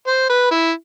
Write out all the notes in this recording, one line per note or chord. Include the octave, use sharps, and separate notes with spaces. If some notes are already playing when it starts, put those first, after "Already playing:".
C5
B4
E4